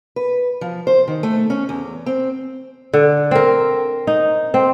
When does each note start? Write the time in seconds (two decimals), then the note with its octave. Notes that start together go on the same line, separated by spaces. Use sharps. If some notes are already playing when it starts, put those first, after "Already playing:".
0.16 B4
0.61 F3
0.87 C5
1.08 D#3
1.23 A3
1.50 C#4
1.69 E2
2.06 C4
2.93 D3
3.31 C4 A#4
4.07 D#4
4.54 C4